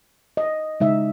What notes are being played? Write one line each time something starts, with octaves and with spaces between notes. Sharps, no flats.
D#5
C#3 G#3 D#4 E5